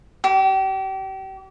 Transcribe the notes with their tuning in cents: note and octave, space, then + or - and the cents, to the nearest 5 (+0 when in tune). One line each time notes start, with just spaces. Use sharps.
G4 -35